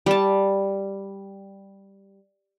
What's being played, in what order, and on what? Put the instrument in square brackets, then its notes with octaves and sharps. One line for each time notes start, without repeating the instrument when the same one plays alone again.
[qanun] G3 A5